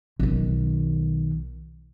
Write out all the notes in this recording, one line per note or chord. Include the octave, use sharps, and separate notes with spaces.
B1 D#3